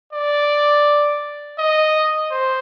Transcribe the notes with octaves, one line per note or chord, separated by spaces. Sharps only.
D5
D#5
C5